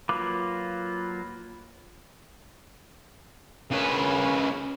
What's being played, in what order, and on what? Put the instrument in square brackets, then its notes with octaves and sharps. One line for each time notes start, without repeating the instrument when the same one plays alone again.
[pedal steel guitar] F#3 A#3 F4 B4 D6
[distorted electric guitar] C#3 B4 [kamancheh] C#4 A#4